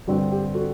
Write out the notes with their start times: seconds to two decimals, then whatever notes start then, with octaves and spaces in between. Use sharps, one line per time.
0.07 G2 D3 G3 C4 F#4
0.32 G4
0.55 F#4 A4